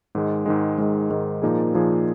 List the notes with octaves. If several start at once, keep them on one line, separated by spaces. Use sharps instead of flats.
G#2 D#3 G#3
G#2 D#3 G#3
G#2 D#3 G#3
G#2 D#3 G#3
A#2 F3 A#3 D#4 G#4
A#2 F3 A#3 D#4 G#4